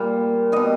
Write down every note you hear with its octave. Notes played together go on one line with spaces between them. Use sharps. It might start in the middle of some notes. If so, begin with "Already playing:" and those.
Already playing: A#2 G3
B2 G3 D#5